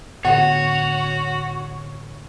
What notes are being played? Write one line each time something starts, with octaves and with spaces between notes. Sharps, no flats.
A2 D3 B3 F#4 C#5 F#5